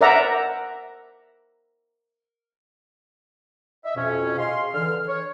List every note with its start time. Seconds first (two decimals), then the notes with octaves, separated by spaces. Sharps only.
0.01 A#4 C5 D5 E5 F#5 A#5
3.84 D#5 E5
3.96 F2 B2 C#4
4.38 G#4 D#5 F5 C6
4.73 D3 E3 F6
5.08 C#5